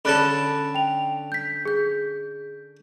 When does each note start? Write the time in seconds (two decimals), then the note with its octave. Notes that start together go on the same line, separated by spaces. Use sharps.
0.05 D3 C#4 A4 B5 F#6 A6
0.75 G5 F7
1.32 G6 B6
1.65 G#4 G6